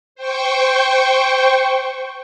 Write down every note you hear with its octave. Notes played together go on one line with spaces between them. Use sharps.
C5 G5 C#6